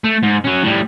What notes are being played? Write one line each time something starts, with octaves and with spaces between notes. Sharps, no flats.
A3
G#2
F#3 C#4
A2 G3